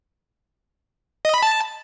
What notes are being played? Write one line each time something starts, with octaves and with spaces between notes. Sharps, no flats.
D#5
B5
A5